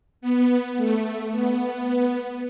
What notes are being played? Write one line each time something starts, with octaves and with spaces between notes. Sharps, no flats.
B3
A3
B3